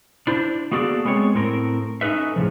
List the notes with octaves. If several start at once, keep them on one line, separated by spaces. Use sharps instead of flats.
D4 E4 C5 D5
A#3 B3 F#4 G#4 A4 D5
G#3 B3 C4 C5 C#5
A2 C4 A#4
C#4 D#4 A4 B4 E5
A2 C#3 F3